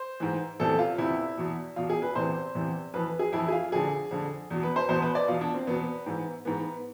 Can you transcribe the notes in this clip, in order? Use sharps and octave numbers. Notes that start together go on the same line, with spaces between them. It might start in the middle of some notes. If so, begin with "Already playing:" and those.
Already playing: C5
G#2 E3
E2 C3 E3 A4
F4
E2 C3 E3 E4
E2 B2
E2 B2 F4
G#4
B4
E2 C3 E3 C5
E2 C3 E3
F2 E3 B4
G#4
F2 E3 E4
G#4
F4
F2 D3 G#4
F2 D3
E2 B2
B4
C5
E2 B2 C5
B4
D5
E2 B2 F4
D4
C4
E2 B2 B3
G#2 E3
G#2 E3 B3